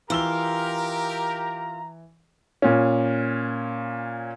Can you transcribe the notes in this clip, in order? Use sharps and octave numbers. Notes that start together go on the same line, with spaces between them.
E3 F4 G4 A#4 A#5 E6 G7
A#2 C#4